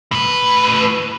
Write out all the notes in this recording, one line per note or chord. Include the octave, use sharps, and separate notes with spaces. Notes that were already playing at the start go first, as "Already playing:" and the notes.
A2 B4